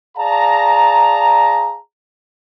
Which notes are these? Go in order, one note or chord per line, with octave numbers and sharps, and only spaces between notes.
G#4 D5 F5 A5 A#5